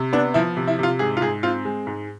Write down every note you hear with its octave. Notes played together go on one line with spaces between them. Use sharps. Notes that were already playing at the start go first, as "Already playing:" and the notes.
Already playing: C3
B3 D4
F3 E4
C3
E4
C3 F4
G#2 G#4
F4
G#2 G#4
C4 F4
G#3
G#2